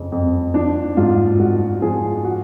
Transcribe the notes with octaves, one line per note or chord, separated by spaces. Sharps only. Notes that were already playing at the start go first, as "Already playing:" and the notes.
Already playing: F2 C#3
F2
F3 D4
G#2 F4
G#2 F#4
F3 G#4
F#4